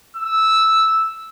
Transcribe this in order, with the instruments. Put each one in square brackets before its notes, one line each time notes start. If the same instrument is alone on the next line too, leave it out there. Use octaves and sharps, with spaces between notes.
[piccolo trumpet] E6